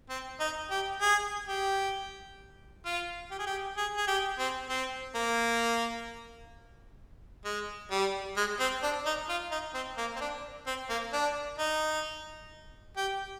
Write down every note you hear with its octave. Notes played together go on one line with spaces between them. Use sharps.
C4
D#4
G4
G#4
G4
F4
G4
G#4
G4
G#4
G#4
G4
C4
C4
A#3
G#3
G3
G#3
C4
D4
D#4
F4
D#4
C4
A#3
C4
D4
C4
A#3
D4
D#4
G4